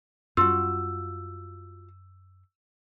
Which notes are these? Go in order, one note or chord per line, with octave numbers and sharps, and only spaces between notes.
F#2 G3 F4 F#4 E6